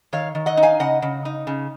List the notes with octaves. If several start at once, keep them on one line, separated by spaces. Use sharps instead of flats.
D#3 C#5 F5
D#3
D#5 F#5
D#4
F5 G#5
C#3 D#5 F#5
C#3
D#4
C#3